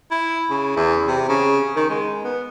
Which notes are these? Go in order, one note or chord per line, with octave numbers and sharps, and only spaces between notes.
E4
C#3
E2
C3
C#3
D#3
G#3
B3